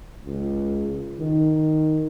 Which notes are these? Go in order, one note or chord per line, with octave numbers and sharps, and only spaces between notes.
C#2
D#3